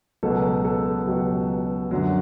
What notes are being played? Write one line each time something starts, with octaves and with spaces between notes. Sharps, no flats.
C#2 B2 F#3 A4
A4
C#2 B2 F#3 G4
F#2 D3 F#3